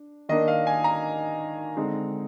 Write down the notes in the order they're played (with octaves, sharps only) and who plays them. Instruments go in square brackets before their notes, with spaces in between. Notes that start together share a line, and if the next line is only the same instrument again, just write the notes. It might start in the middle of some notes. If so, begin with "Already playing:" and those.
Already playing: [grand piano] D4
D#3 A#3 D4 D#5
F5
G#5
A#5
D3 G#3 C4 D#4